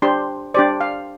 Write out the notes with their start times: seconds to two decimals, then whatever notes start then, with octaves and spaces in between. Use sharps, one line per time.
0.02 D4 G4 C5 C6
0.54 D4 G4 C5 D5
0.81 F5